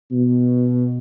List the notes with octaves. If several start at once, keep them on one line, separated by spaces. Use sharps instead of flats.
B2